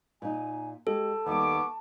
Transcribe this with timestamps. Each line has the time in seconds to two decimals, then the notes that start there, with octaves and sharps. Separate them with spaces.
0.22 A#2 D#4 G#5
0.87 G#3 G4 A4 A5
1.26 D#2 G3 B3 C#6 D6